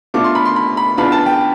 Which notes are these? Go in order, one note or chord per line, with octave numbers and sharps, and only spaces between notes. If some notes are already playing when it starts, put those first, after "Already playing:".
B2 A3 D4 F4 D6
C6
B5
C6
B5
B5
E2 B2 B3 D4 F4 B5
A5
G5